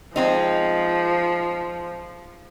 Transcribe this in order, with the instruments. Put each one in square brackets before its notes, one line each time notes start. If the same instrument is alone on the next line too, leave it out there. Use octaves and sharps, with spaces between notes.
[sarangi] F3 [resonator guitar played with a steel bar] G#3 C4 D#4